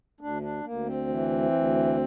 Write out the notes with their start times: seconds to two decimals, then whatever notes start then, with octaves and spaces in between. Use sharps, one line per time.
0.20 D2 D4
0.42 D4
0.64 D2 A#3
0.86 C4
1.08 E3
1.52 D2